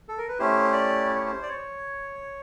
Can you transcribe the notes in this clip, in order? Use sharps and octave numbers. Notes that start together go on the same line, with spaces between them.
A4
A#4
B4
A3 C#4 E4 G4 C5
D5
C#5
C5
D5
C#5